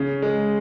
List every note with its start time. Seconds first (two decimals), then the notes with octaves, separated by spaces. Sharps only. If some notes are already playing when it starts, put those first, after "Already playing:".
Already playing: C#3
0.22 G#3